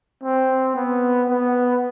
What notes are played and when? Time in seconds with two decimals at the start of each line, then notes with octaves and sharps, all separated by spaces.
0.24 C4
0.75 B3
1.29 B3